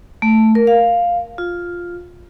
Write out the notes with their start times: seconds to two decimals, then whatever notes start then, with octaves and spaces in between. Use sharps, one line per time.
0.22 A3
0.55 A#4
0.67 F5
1.38 F4